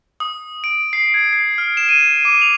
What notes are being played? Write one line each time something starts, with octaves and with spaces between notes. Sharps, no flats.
D#6
D7
C7
G#6
C7
F6
E7
D#7
D6
F7